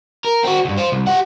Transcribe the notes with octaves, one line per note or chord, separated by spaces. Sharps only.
A#4
C4 F#4
C#2 G2
F4 C5
C2
G4 F#5